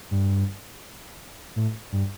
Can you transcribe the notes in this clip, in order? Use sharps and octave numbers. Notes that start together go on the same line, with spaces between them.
G2
A2
G2